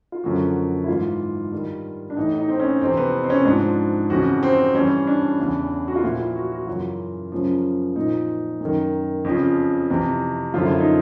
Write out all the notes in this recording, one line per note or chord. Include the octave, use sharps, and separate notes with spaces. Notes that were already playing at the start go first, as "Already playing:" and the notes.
F4
F#2 D3 F3 F#4
E4
G#2 E3 F4
G2 D#3
D4
A2 E3 D#4
D#4
C4
C#4
F2 C3 E3 C4
B3
C4
C#4
G#2 F3 D4
F2 C#3 E3 F#4
C4
G2 E3 C#4
D4
E2 C#3 E3
F#4
F4
A#2 F3 E4
F4
F#4
F#4
F#2 C#3 E3 F4
F#2 C#3 F3
A#2 F3 D#4
F#2 D#3
F2 C#3 F3
F2 C3 E3
F#2 D3 F3 F4
E4
D#4